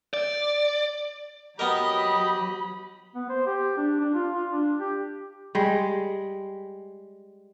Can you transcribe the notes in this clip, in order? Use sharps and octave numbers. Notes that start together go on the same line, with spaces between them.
D5
F#3 B3 G4 A#4 D#5 B5
B3
C5
G4
D4
D4
F4
F4
D4
G4
G3 G#3